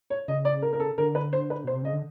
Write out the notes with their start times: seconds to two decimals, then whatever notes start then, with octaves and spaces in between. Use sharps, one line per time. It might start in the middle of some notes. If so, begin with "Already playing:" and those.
0.10 C#5
0.28 C#3 D#5
0.45 D5
0.62 A#4
0.73 A#4
0.80 A4
0.98 D3 A#4
1.15 B4
1.33 C5
1.50 B4
1.64 B2 C5
1.73 C3
1.83 C#3 D#5
1.93 D3